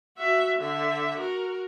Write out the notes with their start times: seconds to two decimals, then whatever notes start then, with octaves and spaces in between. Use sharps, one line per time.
0.18 F#4 E5
0.59 D3 E5
1.18 F#4 A#4